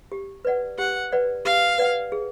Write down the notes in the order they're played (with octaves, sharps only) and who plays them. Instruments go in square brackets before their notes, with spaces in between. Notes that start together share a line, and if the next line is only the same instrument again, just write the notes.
[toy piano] G4
B4 D5 F#5
[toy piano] G4 [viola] F#5
[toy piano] B4 D5 F#5
[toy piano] G4 [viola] F5
[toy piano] B4 D5 F#5
G#4